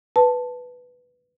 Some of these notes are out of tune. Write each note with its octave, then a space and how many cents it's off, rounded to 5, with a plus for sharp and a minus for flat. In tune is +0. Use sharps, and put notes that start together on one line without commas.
B4 +0 A5 +0